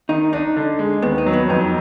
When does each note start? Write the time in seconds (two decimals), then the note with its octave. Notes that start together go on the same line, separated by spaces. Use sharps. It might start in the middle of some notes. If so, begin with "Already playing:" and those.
0.09 D#3 D#4
0.33 D4 D#4
0.57 D3
0.79 G#3
1.02 D#2 B3
1.18 D#4
1.26 F#3
1.33 B3
1.49 F2 D#4